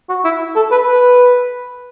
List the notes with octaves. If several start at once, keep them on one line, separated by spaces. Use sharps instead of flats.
F#4
E4
A4
B4
B4